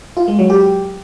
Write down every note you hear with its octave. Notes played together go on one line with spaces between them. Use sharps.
F4
G#3
F#3
G4